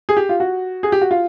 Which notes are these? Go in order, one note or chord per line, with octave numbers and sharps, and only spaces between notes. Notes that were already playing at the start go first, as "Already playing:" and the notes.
G#4
G4
F4
F#4
G#4
G4
F#4
F4